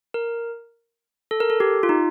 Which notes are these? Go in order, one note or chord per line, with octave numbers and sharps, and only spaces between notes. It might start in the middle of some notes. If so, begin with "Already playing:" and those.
A#4
A4
A#4
A4
G4
F4
D#4